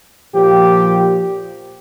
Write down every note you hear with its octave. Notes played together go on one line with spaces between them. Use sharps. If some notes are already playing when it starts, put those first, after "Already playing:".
A#2 F3 G4